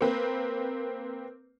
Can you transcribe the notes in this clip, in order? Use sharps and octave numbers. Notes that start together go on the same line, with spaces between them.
A#3 C4 B4